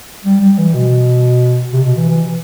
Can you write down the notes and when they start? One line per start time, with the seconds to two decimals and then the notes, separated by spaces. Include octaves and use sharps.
0.25 G3
0.41 G3
0.58 E3
0.73 B2
1.72 C3
1.84 B2
1.96 E3
2.09 E3